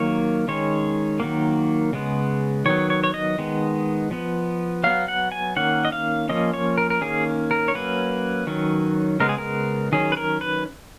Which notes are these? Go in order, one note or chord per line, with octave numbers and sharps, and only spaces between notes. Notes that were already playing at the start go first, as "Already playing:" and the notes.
Already playing: D#3 F#3 A#3 C#5
D#3 G#3 C#4 C#5
D#3 F#3 A#3
C#3 G#3 B3
D#3 F#3 B3 C#5
C#5
C#5
D#5
D#3 G#3 B3
F3 B3
F#3 B3 F5
F#5
G#5
D#3 A#3 C#4 F#5
D#5
F5
F3 A#3 C#4 D#5
C#5
A#4
A#4
D#3 A#3 C#4 G#4
A#4
C#5
F#3 A#3 C#4 B4
D#3 F#3 C#4
C#3 G#3 B3 A#4
G#4
A#4
D#3 F#3 C#4 G#4
B4
A#4
B4